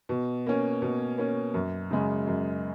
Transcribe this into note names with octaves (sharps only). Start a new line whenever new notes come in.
B2
A#3 C#4
B2
A#3 C#4
F#2
C#3 G#3
F#2